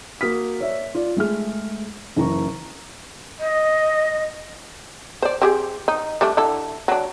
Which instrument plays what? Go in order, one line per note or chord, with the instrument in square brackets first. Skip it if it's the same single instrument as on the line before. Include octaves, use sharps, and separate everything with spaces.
[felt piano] A#3 F#4 D#6 F6 B6
C#5 D5 E5
F4 D5
G#3 A3 G#4 F6
F#1 E3 A#5 C#6
[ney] D#5
[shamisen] C5 D5
C4 G4 G#4
D#4
G3 A3 D4
D3 E4 A4
F#3 D4